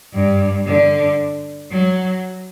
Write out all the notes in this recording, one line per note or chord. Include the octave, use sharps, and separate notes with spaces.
G2
D3
F#3